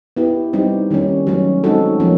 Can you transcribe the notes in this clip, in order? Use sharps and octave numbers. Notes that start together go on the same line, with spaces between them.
B3 E4 G4
G3 C4 D#4 G4
D#3 G3 A#3 C#4
F#3 A3 C#4
G#3 C4 D#4 F#4 A4
F3 A#3 C#4